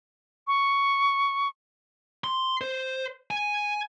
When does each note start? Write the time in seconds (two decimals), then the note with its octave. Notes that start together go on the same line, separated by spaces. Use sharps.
0.47 C#6
2.24 C6
2.61 C5
3.31 G#5